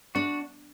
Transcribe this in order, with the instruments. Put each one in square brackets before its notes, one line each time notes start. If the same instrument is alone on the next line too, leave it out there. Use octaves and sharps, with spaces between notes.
[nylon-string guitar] D4 [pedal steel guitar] F#4